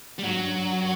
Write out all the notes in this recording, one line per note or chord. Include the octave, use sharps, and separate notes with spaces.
G3
G#2 F#3
F#2
G2
G2
F#2